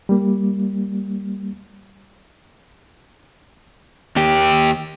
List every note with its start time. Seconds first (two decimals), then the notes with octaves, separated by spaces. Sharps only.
0.09 G3 A#3
4.16 D#2 G4